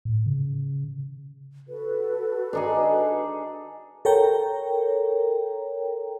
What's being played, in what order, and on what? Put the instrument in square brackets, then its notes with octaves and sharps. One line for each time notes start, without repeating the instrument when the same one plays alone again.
[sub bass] A2
C#3
[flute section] F#4 A4 B4
[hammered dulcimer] D4 D#4 G#4
[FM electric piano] A4 A#4 C#5 G5 A#5